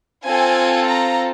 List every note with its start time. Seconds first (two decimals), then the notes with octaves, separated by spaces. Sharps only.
0.25 C4 F4 A4 G#5
0.86 A#5